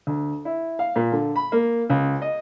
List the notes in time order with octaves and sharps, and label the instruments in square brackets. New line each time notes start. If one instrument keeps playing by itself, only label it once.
[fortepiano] D2
E4
F5
A#2
D3
B5
A#3
C#2
D#5